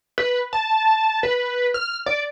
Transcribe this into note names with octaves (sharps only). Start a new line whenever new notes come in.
B4
A5
B4
F6
D5